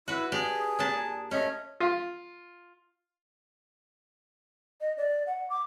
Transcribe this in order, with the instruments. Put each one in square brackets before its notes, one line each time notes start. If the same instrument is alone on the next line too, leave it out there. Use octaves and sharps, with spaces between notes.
[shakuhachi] E4 [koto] F#4 B4
[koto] D4 G4 D5 [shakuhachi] G#4
[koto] A#2 D4 A5
[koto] A3 C#4 [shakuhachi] D#5
[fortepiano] F4
[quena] D#5
D5
F#5
D6